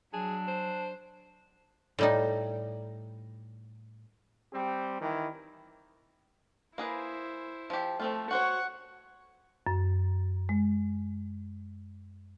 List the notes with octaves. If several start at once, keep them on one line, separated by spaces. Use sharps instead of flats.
F#3 D4 G#4
C5
A2 G3 D#4
G3 C4 G4
D#3 E3
A#3 E4 G#4 B4 C5
F3 G4
F3 A3 C4 F4
F#4 C5 C#5 F#5 C#6
F#2
G#3